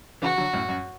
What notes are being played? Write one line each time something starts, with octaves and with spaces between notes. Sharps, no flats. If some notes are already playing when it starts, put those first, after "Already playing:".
C#3 E3 F#4
D3 F#3
F#2 A2
F#2